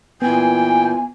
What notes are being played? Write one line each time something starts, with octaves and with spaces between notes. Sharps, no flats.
A#2 E3 B3 E4 G5 G#5